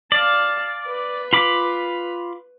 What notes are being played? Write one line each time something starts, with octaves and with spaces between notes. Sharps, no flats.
D5 F5 A5
B4
F4 B5 D6